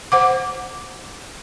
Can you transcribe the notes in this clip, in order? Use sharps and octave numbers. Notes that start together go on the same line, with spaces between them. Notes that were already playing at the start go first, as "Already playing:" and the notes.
C5 F#5 D6